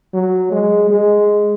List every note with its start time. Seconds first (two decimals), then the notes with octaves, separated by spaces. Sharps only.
0.14 F#3
0.52 G#3
0.91 G#3